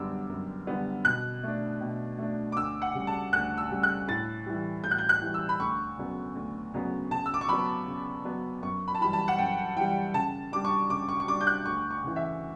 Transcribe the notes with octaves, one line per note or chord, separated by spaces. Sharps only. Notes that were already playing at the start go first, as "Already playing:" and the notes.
Already playing: F#2 D3 G3 B3 D6 E6
F#2
D3 G3 B3
B2 F#6
A3 D4
B2
A3 D4
D6
D2 E6
F#5
C#3 G3
A5
D2 F#6
E6
C#3 G3
F#6
A2 A6
E3 G3
A2 G6
F#6
G6
F#6
E3 G3
E6
B5
D2 C#6
C#3 F#3 B3
D2
C#3 F#3 B3
C#3 A5
E6
D6
C#6
F#3 B3 B5
C#3
F#3 B3
F#2 C#6
B5
A5
E3 G3 B5
A5
F#5
F#2 G5
E3 G3 G5
C#3 A5
G3 D4 D6
C#6
C#3 D6
C#6
C#6
G3 D4 D6
G6
F#6
D2 C#6
C#6
C#3 E3
E5